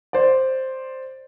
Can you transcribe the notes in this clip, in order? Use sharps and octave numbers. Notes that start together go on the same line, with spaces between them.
C5 D5